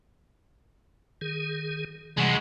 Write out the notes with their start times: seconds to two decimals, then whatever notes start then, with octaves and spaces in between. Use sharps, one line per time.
1.21 D#3 G#4
2.18 C3 E3 G3 G#3 F#4